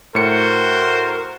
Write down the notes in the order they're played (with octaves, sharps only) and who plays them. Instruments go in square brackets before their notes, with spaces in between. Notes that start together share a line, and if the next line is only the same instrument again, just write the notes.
[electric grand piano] A2 C#7 [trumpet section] F#4 C5 [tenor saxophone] A#4